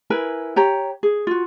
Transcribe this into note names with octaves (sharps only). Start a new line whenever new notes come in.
E4 A#4 B4 G#5
G4 C#5 A#5
G#4
F4 F#4